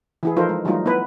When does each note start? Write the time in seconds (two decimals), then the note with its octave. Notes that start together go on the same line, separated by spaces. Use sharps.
0.23 E3 E4 G#4
0.36 F3 D#4 F4 A4 A#4 C5
0.49 G#3
0.65 E3 F#3 G3 A3 D#4 F4
0.86 B3 E4 B4